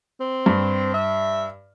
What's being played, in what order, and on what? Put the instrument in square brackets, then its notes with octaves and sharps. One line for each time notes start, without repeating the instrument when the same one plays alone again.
[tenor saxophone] C4
[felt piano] G2
[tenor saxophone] E5